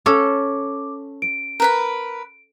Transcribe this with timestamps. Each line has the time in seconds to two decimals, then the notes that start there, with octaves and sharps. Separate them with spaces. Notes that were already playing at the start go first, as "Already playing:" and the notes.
0.06 C#4 A4 D6
1.22 D7
1.60 A#4 B4 B5